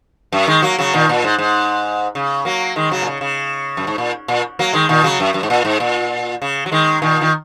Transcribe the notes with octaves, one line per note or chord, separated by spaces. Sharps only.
F#2
D#3 G#3
F#3 A#3
C#3 F#3
A#2 D#3
A#2
G#2
G#2
C#3
F#3 A#3
D#3 G#3
C#3 F#3
A#2
C#3
C#3
F#2
G#2
A#2
A#2
F#3 A#3
D#3 G#3
A#2 D#3
C#3 F#3
F#2
F#2
G#2
A#2
G#2
A#2
C#3
F#3
D#3 G#3
A#2 D#3
D#3